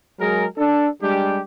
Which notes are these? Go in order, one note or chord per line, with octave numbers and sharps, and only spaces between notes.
F#3 G#3 G#4 A#4
D4 A4
G3 G#3 D4 G4